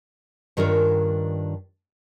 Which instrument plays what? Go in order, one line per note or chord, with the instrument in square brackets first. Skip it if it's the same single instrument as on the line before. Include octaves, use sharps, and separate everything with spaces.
[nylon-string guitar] G2 D#3 D4 F4 A#4 C#5